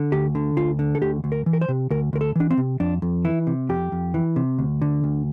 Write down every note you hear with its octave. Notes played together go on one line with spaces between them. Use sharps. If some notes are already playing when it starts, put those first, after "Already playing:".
Already playing: D3
D2 G4
D3
D2 F4
D3
A4
D2 G4
D2
A#4
E3
A#4
C5
C3
D2 A#4
D2 A#4
A4
E3 D4
C4
C3
F2 D4
F2
E3 E4
C3
F2 G4
F2
E3
C3
D2
D3
D2